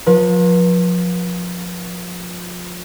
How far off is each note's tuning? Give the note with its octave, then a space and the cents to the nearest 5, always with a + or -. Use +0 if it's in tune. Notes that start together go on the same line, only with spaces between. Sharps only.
F3 +30 B4 -35